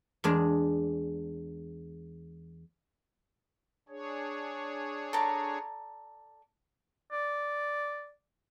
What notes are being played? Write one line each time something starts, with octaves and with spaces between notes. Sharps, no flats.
E2 G#3 D4
D4 G#4 C#5
A4 D5 A#5
D5